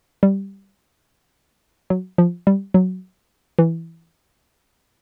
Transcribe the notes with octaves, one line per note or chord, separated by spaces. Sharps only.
G3
F#3
F3
G3
F#3
E3